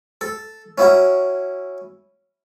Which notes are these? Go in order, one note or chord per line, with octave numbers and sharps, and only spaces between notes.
A4
C#4 E4 F#4 A#4